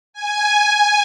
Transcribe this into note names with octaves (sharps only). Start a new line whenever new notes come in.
G#5